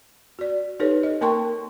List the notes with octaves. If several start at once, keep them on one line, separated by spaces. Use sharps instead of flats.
F#4 D5
D#4 G4 A4 B4 C#5
D#5
A#3 A#4 G5 A5 C6 C#6